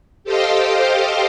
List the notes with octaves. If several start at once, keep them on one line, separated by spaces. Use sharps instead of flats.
G4 A4 C5 D#5 F5 G5